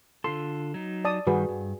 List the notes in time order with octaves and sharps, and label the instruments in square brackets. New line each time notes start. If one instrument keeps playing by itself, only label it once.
[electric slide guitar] D3 F4 A4 [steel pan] C6
[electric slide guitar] F#3 D#4
[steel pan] D5 A5 D#6
[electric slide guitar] G2 D#3 G3 [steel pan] F#4 G#4 B4
[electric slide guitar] G2